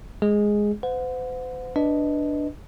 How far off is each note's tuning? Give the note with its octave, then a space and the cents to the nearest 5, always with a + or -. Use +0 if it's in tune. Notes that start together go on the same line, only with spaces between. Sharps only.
G#3 +0 G#4 +0
C5 -45 F#5 -30
D4 +0 B4 +0 D#5 +10